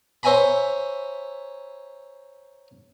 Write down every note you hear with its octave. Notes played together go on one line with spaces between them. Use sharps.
C5 C#5 E5 G#5 A#5 B5